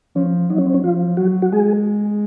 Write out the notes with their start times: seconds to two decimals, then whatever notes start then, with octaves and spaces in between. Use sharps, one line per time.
0.15 F3 C#4
0.49 F#3 D#4
0.58 C#4
0.66 C4
0.74 C#4
0.83 F3 F4
1.17 F#3 F#4
1.42 F#4
1.52 G#3 G#4